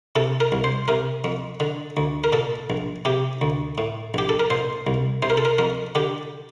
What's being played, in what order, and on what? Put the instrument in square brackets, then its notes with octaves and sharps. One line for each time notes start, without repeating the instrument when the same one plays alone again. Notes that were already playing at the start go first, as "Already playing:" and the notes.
[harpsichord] C3 A4
A#4
C2
C5
C3 A#4
F2
D3
D2
A#4
A#2 A4
A#1
C3 G4
D2
A2
A#1 G4
A4
A#4
A#2 C5
C2
C3 C5
A#4
A4
A#4
F2 A#4
D3 G4